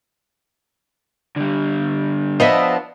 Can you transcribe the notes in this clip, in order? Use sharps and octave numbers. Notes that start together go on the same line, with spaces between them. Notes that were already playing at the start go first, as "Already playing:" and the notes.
D3 G3
F3 B3 D4 D#5 E5